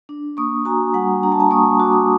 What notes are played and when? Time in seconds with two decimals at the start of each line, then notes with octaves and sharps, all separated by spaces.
0.09 D4
0.37 A#3 C#6 D#6
0.65 F#4 G#5 A#5
0.94 G3 F#5 G#5
1.23 D4 A#5
1.32 A5
1.40 G#5 A#5
1.51 A#3 C#6 D#6
1.79 F#4 D6
1.93 D#6